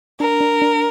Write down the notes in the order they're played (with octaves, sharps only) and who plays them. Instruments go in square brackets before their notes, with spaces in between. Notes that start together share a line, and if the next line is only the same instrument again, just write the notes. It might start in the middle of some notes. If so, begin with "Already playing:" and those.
[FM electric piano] D4 [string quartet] A#4
[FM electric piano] D4
D4